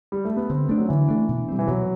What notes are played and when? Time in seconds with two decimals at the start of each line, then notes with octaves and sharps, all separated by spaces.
0.12 G3
0.25 A3
0.37 B3
0.50 D3 C4
0.69 A3 D4
0.78 F#3
0.89 D3 E3
1.08 A3 D4
1.29 B2
1.48 G3 C4
1.59 E3
1.68 B2 F#3